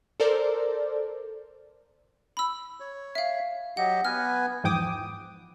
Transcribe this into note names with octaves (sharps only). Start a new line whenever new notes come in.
A4 A#4 C5 D5
B5 E6
C#5
E5 F5
F#3 G4 D#5 F#5
B3 B4 G#5 F6
E2 G#2 F3 G5 D6 D#6